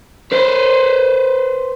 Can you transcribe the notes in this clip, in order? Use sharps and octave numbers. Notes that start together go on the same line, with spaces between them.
B4 C5